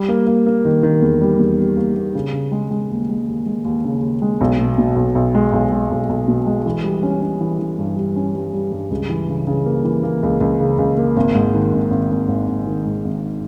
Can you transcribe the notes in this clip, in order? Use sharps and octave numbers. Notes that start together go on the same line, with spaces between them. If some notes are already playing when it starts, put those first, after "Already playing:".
Already playing: G3
A#3
A#3
A#3
D#3
D#3
E2
G3
E2
G3
A#3
A#3
C#3
C#3
G#3
G#3
D#2
G#3
D#2
G#3
D#2
C#3
D#2
G#3
B1
B2
B2
B1
B1
G#3
B1
G#3
B1
B1
B2
G#3
E3
G3
C#4
C#4
E3
E3
G2
G3
C#4
G3
G3
G2
C#2
E3
C#3
C#3
A#3
E3
A#3
C#2
C#2
C#3
C#2
A#3
G#1
G#2
D#3
G#1
G#1
G#1
G#1
G#1
D#3
G#2
G#1